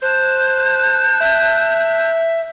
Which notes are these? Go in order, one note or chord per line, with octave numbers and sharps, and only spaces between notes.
C5 A5 F#6 G6
E5